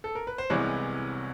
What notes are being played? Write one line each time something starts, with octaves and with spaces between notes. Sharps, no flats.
A4
A#4
B4
C5
C2 C3 E3 G#3 B3 B4 C#5